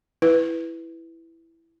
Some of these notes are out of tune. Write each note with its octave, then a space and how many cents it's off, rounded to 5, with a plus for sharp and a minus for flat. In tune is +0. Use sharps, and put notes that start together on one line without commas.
E4 +5 B4 +0